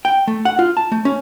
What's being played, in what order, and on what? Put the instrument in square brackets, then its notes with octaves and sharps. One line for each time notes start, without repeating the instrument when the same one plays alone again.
[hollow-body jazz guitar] G5
A3
F#5
F4
A5
A3
C#4